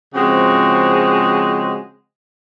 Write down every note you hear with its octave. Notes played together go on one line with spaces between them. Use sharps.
C#3 F3 G#3 C4 F#4